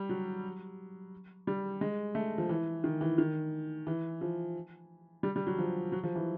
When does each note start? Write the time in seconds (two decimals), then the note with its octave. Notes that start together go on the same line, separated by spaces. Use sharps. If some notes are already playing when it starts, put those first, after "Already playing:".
Already playing: G3
0.09 F#3
1.47 G3
1.81 G#3
2.15 A3
2.38 F3
2.49 E3
2.84 D#3
3.01 E3
3.18 D#3
3.87 E3
4.21 F3
5.23 G3
5.36 G3
5.47 F#3
5.58 F3
5.92 F#3
6.03 F3
6.15 E3